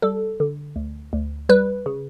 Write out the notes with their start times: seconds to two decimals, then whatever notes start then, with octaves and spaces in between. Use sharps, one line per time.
0.02 G3 A4
0.40 D3
0.76 D2
1.13 D2
1.49 G3 B4
1.86 C#3